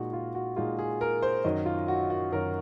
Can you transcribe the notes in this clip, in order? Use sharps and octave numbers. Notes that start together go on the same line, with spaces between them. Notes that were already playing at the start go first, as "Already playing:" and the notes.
Already playing: A#2 G#3 D#4 F#4
F4
F#4
A#2 G#3 D#4 F4
G#4
A#4
C5
F#2 D#3 F#3 D#5
F4
F#4
F#4
F#2 D#3 F#3 A#4